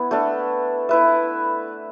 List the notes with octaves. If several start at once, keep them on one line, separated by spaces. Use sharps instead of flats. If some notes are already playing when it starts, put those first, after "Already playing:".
Already playing: B3 E4
A3 D4 A4
E4 B4 E5